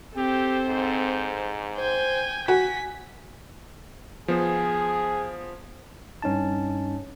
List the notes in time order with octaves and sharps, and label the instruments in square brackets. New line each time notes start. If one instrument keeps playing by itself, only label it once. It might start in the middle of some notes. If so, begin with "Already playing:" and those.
[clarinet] C4 [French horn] G4 [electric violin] A4 C5
[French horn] G#2
[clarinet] C5 [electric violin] G5 G#5
[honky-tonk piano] F#4 [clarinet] G#5 [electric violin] B6
[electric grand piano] F3 B3 C5 [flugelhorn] G#4
[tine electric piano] G2 C#4 D#4 A5